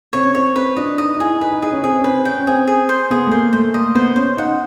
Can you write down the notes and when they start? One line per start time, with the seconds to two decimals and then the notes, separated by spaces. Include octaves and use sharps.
0.13 C4 C#5
0.25 C#4
0.35 C4 C#5
0.56 C4 B4
0.77 D4 D#5
0.98 D#4 D#5
1.15 D#4
1.20 E4 G#4
1.41 D#4 B4
1.51 D#4
1.62 D#4 G#4
1.72 C#4
1.83 C4 G#4
2.00 C#4
2.04 C4 B4
2.25 C#4 G5
2.38 C#4
2.47 C4 G#4
2.67 G#4
2.89 C5
3.11 B3 G#4
3.27 A3
3.31 A#3 C5
3.53 A3 C5
3.74 A#3 D#5
3.95 B3 C5
4.16 C#4 C5
4.37 D#4 F#5